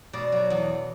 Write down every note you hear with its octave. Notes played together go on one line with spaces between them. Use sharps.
B2 D5
F#3
E2